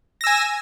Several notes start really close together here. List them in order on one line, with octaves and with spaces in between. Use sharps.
A#6 E6 G#5